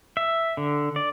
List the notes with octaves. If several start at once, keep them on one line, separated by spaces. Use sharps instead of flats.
E5
D3
D5